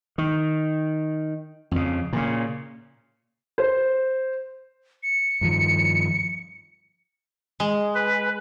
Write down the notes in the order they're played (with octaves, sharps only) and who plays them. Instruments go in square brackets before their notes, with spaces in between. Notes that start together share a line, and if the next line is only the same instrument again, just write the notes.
[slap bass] D#3
F2 C#3
A#2 C#3
[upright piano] C5
[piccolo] C#7
[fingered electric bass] G2 D#3 F3
[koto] G#3
[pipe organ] B4